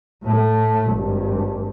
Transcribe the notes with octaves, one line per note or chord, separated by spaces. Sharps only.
A2 A3
G#1 G2